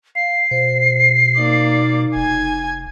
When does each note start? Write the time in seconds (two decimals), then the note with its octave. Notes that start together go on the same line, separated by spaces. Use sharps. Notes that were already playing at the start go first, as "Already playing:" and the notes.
0.15 F5 C7
0.51 B2 C5
1.37 A#3 D#4 D5
2.16 F1 G#5 G#6